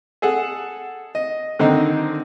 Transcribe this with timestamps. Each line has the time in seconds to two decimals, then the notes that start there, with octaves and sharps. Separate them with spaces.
0.22 G#4 A4 F#5
1.15 D#5
1.59 D3 D#3 C4 D#4